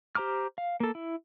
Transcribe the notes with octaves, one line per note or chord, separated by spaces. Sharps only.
G4 C5 A#5 D6 F6
F5
A#3 A4
E4